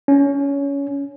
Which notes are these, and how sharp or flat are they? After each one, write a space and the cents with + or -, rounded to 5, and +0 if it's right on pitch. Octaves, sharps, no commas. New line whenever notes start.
C#4 +20